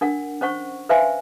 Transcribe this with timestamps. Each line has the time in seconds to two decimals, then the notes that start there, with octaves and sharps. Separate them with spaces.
0.01 D4 A#4 F#5
0.41 C#4 C5 F#5 C#6
0.89 B4 C5 E5 F5 G#5 C6